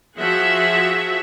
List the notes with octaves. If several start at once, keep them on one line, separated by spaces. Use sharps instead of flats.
F3 F#4 G#4 E5 F#5